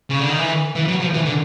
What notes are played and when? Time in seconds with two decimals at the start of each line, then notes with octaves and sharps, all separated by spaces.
0.10 C#3
0.20 D3
0.29 D#3
0.39 E3
0.75 E3
0.88 F#3
1.01 F3
1.14 E3
1.26 D3